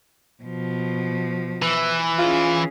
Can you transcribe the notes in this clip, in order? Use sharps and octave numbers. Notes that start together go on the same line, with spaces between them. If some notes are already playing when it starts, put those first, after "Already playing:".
B2 F3
E3
C#4 F4 G#4